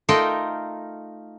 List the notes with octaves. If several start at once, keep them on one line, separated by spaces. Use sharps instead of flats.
A3 D#4 F4 A#4 D#5 G5